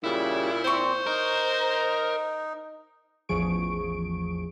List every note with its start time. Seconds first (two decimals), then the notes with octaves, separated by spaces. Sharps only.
0.04 A#2 C#3 G3 E4
0.64 A#2 C4 C5 C#5 C#6
1.06 D#4 A#4
3.29 A1 E2 F3 G#4 C#6 D7